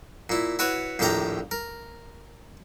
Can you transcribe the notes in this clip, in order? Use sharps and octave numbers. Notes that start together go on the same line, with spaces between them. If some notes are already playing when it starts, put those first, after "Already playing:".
A#2 E4
E4 F#4 B4 C#5
A#1 D#2 A2 G4 G5 A#5
A#4